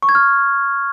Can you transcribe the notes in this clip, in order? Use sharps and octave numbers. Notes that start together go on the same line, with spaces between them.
C#6
G#6
F6